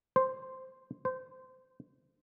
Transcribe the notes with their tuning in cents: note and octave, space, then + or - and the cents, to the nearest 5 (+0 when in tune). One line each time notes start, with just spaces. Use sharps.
C5 +0
C5 -20